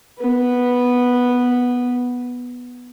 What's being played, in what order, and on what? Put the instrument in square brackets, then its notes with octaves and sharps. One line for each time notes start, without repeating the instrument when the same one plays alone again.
[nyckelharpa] B3 B4